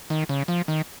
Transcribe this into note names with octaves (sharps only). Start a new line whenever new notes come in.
D#3
C#3
F3
D#3